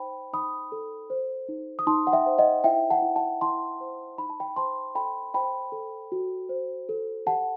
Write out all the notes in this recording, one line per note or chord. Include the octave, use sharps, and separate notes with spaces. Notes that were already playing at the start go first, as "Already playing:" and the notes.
Already playing: D#4 C5 G5 B5
D#4 B5 D#6
A4
C5
D#4
D#6
D#4 A5 C6
F#5
E5 G5
C5
D#5 F#5
E4 E5 G5
F#5 A5
E4
F#5 A5
E4 A5 C6
C5
D#4 B5
A5
G5 B5
C5 A5 C6
A4 G5 B5
C5 G5 B5
A4
F#4
C5
A4
G4 F#5 A5